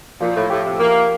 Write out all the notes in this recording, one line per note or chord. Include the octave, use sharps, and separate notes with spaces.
A#2 F3
A2
A2 G4
C3
A3
F3 A#3